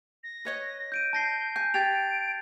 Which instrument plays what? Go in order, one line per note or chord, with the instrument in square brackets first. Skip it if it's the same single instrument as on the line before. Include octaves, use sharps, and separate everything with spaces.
[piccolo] A#6
[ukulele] B4 C#5 D#5
[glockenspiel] G6 D7 D#7
[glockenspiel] A5 A#6 C7 [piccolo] G6
[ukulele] G#5 [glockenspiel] G6
[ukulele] G4 [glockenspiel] G#6 A6 F7 [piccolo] D7